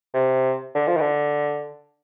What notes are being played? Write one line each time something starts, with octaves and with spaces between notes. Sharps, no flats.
C3
D3
F3
D#3
D3